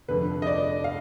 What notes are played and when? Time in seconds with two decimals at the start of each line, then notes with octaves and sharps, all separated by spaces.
0.08 F1 F2 D3 B4
0.42 D#5
0.47 D5
0.84 F5